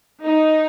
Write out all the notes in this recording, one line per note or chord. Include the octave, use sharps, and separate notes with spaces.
D#4